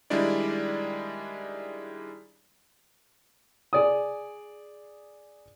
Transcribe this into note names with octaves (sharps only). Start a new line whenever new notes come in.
D#3 G3 G#3 D4 E4 D5
G#4 D5 D#6